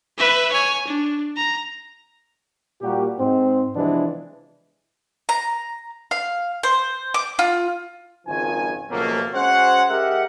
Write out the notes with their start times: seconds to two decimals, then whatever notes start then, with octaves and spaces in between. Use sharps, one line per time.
0.18 B4 E5
0.52 C#5 G#5
0.88 D4
1.37 A#5
2.82 A#2 G3 A#3 F#4 G4
3.18 G#2 C4
3.74 C3 E3 F3 G#3 B3 D4
5.29 A#5
6.11 F5
6.63 C5
7.14 D6
7.39 F4
8.27 G#1 C#2 D#3 F3 G#5
8.91 C#2 B2 F3 F#3 A3 A#3
9.34 G#3 C#4 F#4 C5 C#5 F#5
9.89 G#3 G4 A#4 E5 F#5